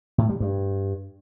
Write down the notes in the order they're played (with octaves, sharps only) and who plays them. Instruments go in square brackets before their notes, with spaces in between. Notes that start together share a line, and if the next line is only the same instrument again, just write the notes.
[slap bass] A2
G3
G2